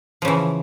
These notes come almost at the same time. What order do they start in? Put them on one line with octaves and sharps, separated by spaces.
F3 C#3 E3